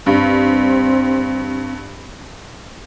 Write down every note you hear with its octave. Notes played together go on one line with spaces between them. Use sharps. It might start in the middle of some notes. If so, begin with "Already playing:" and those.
G2 C4